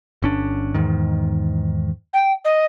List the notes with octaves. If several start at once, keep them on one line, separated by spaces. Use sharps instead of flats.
G1 C#4 D4
E2 G#2 D#3
G5
D#5